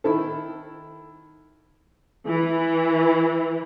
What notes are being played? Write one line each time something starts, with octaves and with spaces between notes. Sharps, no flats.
D#3 E4 A4
E3